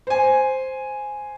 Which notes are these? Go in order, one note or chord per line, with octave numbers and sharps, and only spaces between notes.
C5 G#5